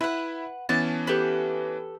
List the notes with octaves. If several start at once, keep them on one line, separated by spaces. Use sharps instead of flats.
E4 B4 E5 F#5 B5
E3 B3 C#4 A5
G4 A4 B4